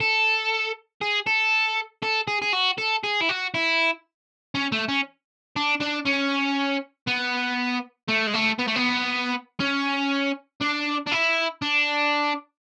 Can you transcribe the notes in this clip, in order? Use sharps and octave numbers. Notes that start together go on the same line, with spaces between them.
A4
G#4
A4
A4
G#4
G#4
F#4
A4
G#4
E4
F#4
E4
C#4
A3
C#4
D4
D4
C#4
B3
A3
G#3
A3
B3
A3
B3
C#4
D4
D4
E4
D4